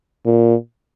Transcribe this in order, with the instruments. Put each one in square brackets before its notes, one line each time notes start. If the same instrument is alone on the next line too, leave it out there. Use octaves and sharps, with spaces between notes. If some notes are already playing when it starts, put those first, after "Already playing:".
[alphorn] A#2